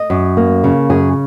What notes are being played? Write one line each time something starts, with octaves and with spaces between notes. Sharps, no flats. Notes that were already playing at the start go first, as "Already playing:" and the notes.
Already playing: D#5
F#2
A#3
C#3
F#2 G#4